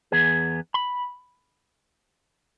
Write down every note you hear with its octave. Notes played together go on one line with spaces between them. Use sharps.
E2 B3 G#4
B5